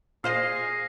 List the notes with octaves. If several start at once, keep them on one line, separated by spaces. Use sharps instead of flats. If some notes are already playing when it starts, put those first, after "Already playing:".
A#2 G#4 C5 D#5 F5 A#6 C7